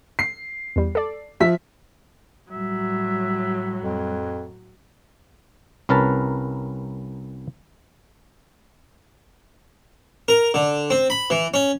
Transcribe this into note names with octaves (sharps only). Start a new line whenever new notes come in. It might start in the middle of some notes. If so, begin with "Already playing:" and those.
C7
E2 G3
A4 D5
F3 E5 B6
A2 F#3 G3 E5
F2
C2 C#4 A#4 B4 A5
A#4
D3
C4
B5
E3
C#4